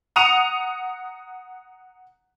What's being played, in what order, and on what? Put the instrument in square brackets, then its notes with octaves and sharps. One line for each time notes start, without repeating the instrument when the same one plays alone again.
[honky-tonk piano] F#5 A#5 D#6 C#7 D#7 F7